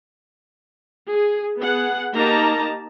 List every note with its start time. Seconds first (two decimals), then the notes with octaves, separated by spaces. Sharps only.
1.11 G#4
1.60 B3 G#4 F#5
2.15 A#3 D#4 G4 D#5 A5 A#5